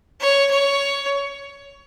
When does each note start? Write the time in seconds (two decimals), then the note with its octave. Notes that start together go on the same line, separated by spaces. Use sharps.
0.20 C#5
0.50 C#5